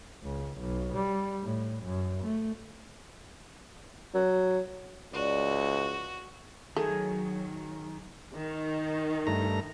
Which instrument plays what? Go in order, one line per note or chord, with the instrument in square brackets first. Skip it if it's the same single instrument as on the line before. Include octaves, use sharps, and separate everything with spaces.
[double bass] C#2
B1
G3
A2
F#2
A3
[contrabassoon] F#3
[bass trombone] C#2 [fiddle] F#4 [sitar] D5
[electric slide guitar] D#3 [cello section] F#3 [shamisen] A3 [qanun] G#4
[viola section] D#3
[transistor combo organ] G2 A3 A#5